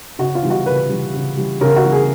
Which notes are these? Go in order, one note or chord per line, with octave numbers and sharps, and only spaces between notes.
C#3 F#4
F4
E3 G3
F#4
C#3 B4
E3 G3
C#3
E3 G3
C#3 A#4
F#4
E3 G3
G#4